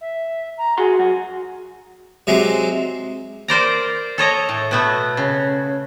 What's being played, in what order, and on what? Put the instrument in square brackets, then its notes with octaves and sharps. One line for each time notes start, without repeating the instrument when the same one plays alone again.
[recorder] E5
A#5
[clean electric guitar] F#4 F#5 C6 [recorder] G#4
[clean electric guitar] F#2 F#4 [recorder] F#5
[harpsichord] C3 F#3 G#3
[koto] A#4 C5 D5 A#5
A4 C#5 D#5 A#5
A2
B2 A3 B3
C#3